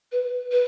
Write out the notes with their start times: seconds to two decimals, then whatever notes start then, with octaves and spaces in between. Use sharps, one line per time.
0.12 B4
0.51 B4